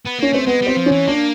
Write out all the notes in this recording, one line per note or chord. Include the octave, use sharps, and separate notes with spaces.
B3
A#3 C#4
A3 C4
G#3 B3
G3 C4
F3
C#4
E3
A#3 D4